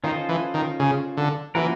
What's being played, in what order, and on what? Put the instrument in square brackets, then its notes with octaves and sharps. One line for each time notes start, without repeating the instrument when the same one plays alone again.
[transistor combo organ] D#3 [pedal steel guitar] C#4 F4 A4 C5 D#5
[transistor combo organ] E3
D#3
C#3
D3
[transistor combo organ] E3 [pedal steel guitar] F3 A#3 C#4 F#4 A#4